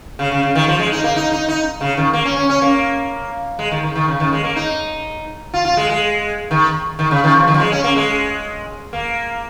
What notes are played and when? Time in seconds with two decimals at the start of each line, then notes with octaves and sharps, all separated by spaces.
0.19 C#3
0.31 C#3
0.43 C#3
0.55 D#3
0.68 F3
0.79 G#3
0.92 D#4
1.04 A#3
1.16 D#4
1.32 D#4
1.49 D#4
1.81 C#3
1.97 D#3
2.13 A#3
2.25 C#4
2.37 C#4
2.50 C#4
2.62 A#3
3.59 G#3
3.71 D#3
3.83 D#3
3.96 D#3
4.08 C#3
4.20 D#3
4.32 G#3
4.44 A#3
4.56 D#4
5.54 F4
5.65 F4
5.77 G#3
5.90 G#3
6.51 D#3
6.99 D#3
7.11 C#3
7.24 D#3
7.35 F3
7.48 D#3
7.54 F3
7.60 G#3
7.72 C#4
7.84 A#3
7.96 G#3
8.93 A#3